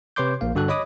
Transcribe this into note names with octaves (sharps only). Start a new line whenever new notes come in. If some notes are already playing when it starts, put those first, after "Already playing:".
C3 B4 C#5 C6 D6 G6
A#1 A#3 F5
G2 D3 F#4 A4 F#6
C#5 D#5 B5 D6 D#6